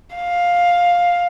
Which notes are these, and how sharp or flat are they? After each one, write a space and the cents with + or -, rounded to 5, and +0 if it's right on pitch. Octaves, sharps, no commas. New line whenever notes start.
F5 +10